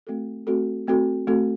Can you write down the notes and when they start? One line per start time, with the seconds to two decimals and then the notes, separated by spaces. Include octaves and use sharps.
0.07 A3 C4 F#4 A4
0.47 A3 C4 F#4 A4
0.87 A3 C4 F#4 A4
1.27 A3 C4 F#4 A4